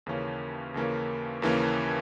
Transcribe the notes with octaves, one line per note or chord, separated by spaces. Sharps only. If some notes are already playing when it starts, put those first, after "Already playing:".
D#2 C#3 E3 A#3 C#4
D#2 C#3 E3 A#3 C#4
D#2 C#3 E3 A#3 C#4